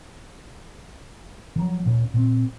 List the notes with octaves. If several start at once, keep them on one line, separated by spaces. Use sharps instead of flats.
F3 F#3
D2 A#2 C#4
A#2 C4